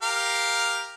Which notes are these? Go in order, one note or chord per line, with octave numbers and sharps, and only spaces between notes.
G4 A#4 F5